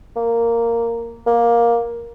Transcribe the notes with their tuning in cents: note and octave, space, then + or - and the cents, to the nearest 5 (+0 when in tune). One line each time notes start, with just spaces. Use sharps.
A#3 -5
A#3 +10